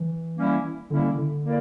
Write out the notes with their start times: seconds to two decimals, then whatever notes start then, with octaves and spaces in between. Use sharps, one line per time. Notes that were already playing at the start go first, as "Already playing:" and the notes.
Already playing: E3
0.37 G3 A#3 C#4 E4
0.90 D3 G3 A#3 C#4 E4
1.17 D3
1.44 A#3 E4 A#4 D5